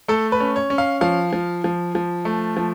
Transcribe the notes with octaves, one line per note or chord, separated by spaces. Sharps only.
A3 A4
B4
C#4
C#5
C#4
F5
F3 F5
F3
F3
F3
A3
F3